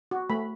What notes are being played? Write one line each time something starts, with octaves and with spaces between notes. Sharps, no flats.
F#4
A3 B5